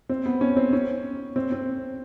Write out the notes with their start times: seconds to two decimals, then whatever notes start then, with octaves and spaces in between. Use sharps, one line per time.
0.09 C4
0.26 B3
0.41 C#4
0.56 C4
0.73 C#4
1.36 C4
1.52 C4